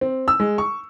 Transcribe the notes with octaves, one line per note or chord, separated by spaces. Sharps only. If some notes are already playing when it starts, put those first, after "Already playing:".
C4
E6
G#3
C#6